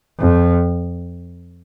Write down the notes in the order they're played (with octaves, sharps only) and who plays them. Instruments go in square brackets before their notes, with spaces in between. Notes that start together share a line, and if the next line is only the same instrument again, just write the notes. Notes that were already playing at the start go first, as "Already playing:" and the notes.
[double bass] F2